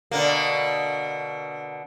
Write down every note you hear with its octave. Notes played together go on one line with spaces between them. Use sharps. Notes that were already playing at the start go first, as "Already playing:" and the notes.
B2 D3 A#3